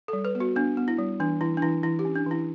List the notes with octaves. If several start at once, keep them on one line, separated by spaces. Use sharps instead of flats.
A4
G3
B4
B3
F#4
B3 D4
B3
E4
G3
E3 D4
E3 E4
D4
E3 E4
E3 E4
G4
C#4
D4
E3 E4